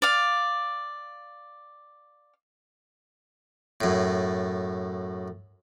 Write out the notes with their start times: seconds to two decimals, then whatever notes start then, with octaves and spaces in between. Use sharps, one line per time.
0.02 D5 F5
3.81 F#2 A2